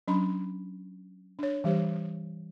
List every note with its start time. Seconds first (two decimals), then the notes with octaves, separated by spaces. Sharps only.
0.08 F#3 C#4 D4 B5 C6
1.39 D4 C#5
1.64 E3 G3 G4 C5